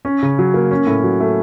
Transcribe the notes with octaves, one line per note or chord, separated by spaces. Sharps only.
C#4
C#3
F#3
A#3
C#4
A2
F#3
A3